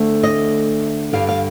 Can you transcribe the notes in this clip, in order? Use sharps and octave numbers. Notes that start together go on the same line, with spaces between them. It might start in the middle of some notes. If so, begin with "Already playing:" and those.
Already playing: D2 D3 A3 C4
D#5
G2 D3 G3 F5
F5